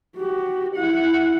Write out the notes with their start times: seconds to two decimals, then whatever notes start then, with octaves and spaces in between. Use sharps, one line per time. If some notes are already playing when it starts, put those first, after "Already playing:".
0.17 F#4 G4
0.76 E4 F#5